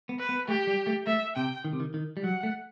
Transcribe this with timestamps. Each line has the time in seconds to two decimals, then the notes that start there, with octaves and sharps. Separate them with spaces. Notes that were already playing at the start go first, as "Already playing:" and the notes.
0.09 B3
0.19 B4
0.29 B3
0.48 A3 G4
0.67 G3
0.87 A3
1.06 A3 E5
1.36 C3 G5
1.65 D#3
1.73 C3
1.80 D#3
1.94 D#3
2.17 G3
2.24 F#3 F#5
2.43 A3